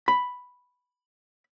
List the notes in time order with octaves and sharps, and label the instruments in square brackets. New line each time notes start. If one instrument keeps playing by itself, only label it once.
[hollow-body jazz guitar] B5